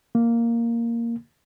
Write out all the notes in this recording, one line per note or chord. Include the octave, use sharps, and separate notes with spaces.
A#3